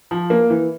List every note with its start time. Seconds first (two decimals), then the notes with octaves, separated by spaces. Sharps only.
0.11 F3
0.30 A#3
0.50 E3